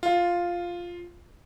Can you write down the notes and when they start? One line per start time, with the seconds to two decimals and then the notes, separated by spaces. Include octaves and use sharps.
0.03 F4